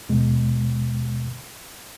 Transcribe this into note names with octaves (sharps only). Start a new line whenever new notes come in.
D#2 B2 G#3